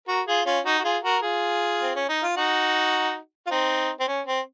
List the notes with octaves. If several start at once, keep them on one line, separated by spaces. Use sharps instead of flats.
F#4 A#4
F4 G#4
C#4 F4
D#4 F#4
F#4
F4 G#4
F#4 A#4
F4 G#4
C4
C#4
D#4
F4
D#4 F#4
F4
C4 D#4
C4
C#4
C4